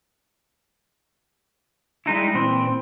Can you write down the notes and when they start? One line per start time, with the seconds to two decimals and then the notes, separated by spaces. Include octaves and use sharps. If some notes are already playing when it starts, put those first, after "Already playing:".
2.06 G3 G#3 D#4 E4
2.34 A#2 E3 C4